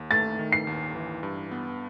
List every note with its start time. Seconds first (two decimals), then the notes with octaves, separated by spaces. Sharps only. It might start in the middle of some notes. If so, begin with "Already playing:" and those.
Already playing: D#2
0.11 A3 A6
0.39 D#3
0.52 C7
0.67 D#2
0.95 E3
1.23 G2
1.51 B3